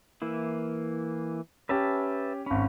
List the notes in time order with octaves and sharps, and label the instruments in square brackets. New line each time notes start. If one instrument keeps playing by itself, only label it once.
[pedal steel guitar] E3 A#3 E4
[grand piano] C#4 G4 [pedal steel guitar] B4 E5 A5
[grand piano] G#1 B5 [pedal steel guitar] C#4